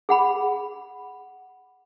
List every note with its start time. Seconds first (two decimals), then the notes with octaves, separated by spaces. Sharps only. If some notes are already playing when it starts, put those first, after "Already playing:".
0.09 G#4 F#5 B5